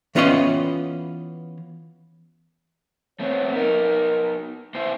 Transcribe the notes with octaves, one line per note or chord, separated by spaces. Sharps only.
E3 B3 C#4 F4 C#5 D#5
A3 B3 C4 C#5
B3 D#4 A#4
B3 E4 C5 E5